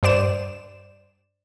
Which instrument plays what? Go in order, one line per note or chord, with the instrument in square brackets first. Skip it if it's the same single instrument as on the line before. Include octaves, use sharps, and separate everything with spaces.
[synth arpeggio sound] G2 C5 D5 E7